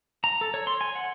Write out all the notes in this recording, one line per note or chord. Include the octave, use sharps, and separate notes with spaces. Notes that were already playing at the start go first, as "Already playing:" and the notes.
A#5
A4
C#5
C6
G#5
F#5